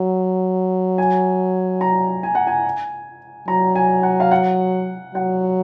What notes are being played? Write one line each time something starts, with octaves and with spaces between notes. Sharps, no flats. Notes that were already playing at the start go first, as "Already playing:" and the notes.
Already playing: F#3
G#5
A#5
G#5
F#5
G#5
F#3 A#5
G#5
F#5
F5
F#5
F#3 F#5